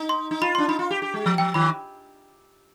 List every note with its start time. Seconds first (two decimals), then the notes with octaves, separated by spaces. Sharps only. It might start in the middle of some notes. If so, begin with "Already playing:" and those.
Already playing: D#4
0.09 C6
0.31 D#4
0.42 F4 B5
0.55 D4 C6
0.68 D#4 B5
0.79 F4
0.90 G4
1.02 G4
1.14 G#3
1.26 F3
1.38 F3 G5
1.54 D#3 B5